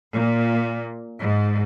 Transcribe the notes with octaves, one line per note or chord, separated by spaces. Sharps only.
A#2
G#2